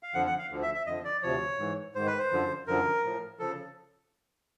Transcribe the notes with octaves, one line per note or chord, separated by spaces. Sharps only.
F5
F2 D3 F3 F#5
F#5
F5
D2 D3 F3
E5
E5
F2 D3 F3 D#5
D5
D2 C3 F3 C#5
G#2 E3
G#2 D#3 C5
B4
C5
F#2 D3 F3
F#2 D3 F3 A#4
A2 F3
C#3 F3 A4